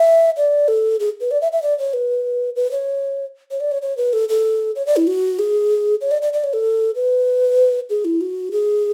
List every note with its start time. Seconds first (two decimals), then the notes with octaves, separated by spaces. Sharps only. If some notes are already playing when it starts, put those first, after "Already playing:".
Already playing: E5
0.37 D5
0.68 A4
1.00 G#4
1.21 B4
1.31 D5
1.42 E5
1.52 E5
1.62 D5
1.79 C#5
1.93 B4
2.56 B4
2.72 C#5
3.51 C#5
3.60 D5
3.72 C#5
3.82 C#5
3.97 B4
4.13 A4
4.29 A4
4.76 C#5
4.87 D5
4.96 E4
5.07 F#4
5.39 G#4
6.01 C#5
6.11 D5
6.22 D5
6.33 D5
6.44 C#5
6.53 A4
6.95 B4
7.90 G#4
8.05 E4
8.21 F#4
8.52 G#4